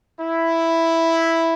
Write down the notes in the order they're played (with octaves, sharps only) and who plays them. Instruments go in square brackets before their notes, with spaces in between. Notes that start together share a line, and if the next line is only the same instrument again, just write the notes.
[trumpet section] E4